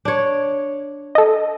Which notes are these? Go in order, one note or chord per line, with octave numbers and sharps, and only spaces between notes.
D4 C#5
A4 D#5